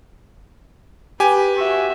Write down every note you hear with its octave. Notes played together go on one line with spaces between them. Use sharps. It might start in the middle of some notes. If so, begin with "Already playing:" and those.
G4 B4 G#5
F#4 E5